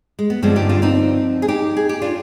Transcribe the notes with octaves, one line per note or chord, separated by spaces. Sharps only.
G#3
B3
G2 D3 F3 G#3 C4
D#4 G4
D4 F4
C4 D#4
G#4
D#4 G4
G#4
G4
D4 F4